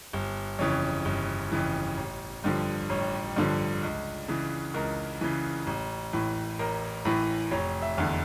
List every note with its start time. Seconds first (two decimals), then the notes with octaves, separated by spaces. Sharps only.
0.13 G1
0.59 F2 C#3 E3 C#5
1.05 G1
1.52 F2 C#3 E3
1.97 A1
2.44 G2 D3 F3
2.90 A1 C#5
3.36 G2 D3 F3
3.83 C#2
4.28 C#3 E3
4.74 C#2 A#4
5.21 C#3 E3
5.67 A1
6.13 A2 E3
6.59 A1 A#4
7.05 A2 E3
7.51 F1 C#5
7.82 E5
7.98 E2 D3